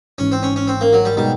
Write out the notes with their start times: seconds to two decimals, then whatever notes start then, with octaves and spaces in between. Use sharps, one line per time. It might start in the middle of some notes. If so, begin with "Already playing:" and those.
0.18 G#1 G#2 E3 C#4
0.32 C4
0.43 C#4
0.56 C#4
0.68 C4
0.81 A#3
0.93 F#3
1.05 G3
1.17 B2 G3 G#3 B3 D#4